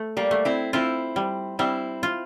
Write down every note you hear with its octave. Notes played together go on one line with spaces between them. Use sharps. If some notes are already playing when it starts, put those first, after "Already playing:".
Already playing: A3
G3 A#3
A3
C4 E4
C4 E4 F4
G3
G3 C4 E4
F4